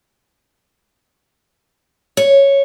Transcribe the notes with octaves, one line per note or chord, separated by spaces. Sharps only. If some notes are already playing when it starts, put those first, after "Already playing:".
C#5